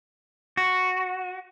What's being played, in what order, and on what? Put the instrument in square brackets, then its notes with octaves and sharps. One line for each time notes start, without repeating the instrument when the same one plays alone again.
[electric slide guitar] F#4